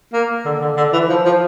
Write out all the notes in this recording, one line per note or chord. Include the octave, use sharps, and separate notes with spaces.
A#3
D3
D3
D3
E3
F3
F3